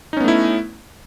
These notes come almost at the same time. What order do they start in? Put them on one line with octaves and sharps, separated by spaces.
D#4 C#4 B3 A3 E4